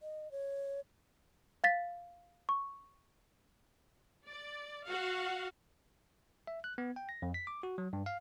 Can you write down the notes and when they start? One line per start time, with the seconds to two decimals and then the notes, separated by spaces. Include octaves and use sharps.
0.01 D#5
0.32 C#5
1.64 F5 A6 B6
2.49 C#6
4.26 D5
4.88 F#4 F5 F#5
6.47 E5
6.64 F#6
6.78 B3
6.96 G5
7.09 A#6
7.22 F2
7.34 B6
7.47 D6
7.63 F#4
7.78 F#3
7.93 G2
8.06 F5